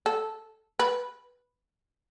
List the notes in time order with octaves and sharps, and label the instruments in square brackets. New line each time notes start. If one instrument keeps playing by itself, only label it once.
[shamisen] A4
B4